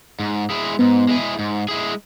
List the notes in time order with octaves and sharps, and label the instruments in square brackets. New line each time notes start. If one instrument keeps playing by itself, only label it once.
[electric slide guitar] G#2
G#3 E4 G#4
[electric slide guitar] G#2 [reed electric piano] B3
[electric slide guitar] G#3 E4 G#4
G#2
G#3 E4 G#4